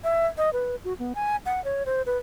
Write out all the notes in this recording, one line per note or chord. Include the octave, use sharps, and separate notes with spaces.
E5
D#5
B4
F#4
B3
G#5
F#5
C#5
C5
B4